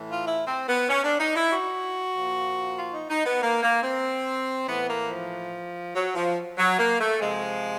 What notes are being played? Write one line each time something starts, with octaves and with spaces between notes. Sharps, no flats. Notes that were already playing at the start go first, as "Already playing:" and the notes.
Already playing: A2 E3
F4
E4
C4
B3
C#4
D4
D#4
E4
F#4
A#2 F3
F4
D#4
D#4
B3
A#3
A#3
C4
A2 E3 B3
A#3
F3
F#3
F3
F#3
A#3
A3
C3 F3 G#3